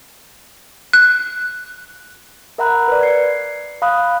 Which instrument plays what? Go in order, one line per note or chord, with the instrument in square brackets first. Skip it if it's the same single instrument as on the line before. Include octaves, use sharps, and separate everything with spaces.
[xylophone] F#6
[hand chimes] A#4 E5 F#5 A#5 B5 F#6
B4 D5
G#6 C7 C#7
F5 B5 D#6 F#6